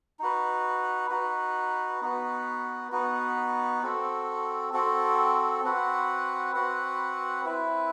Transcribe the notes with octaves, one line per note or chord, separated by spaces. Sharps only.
D#4 F#4 B4
D#4 F#4 B4
B3 D#4 F#4 B4
B3 D#4 F#4 B4
C4 F#4 A4
C4 F#4 A4
C4 F#4 B4 F#5
C4 F#4 B4 F#5
C4 E4 B4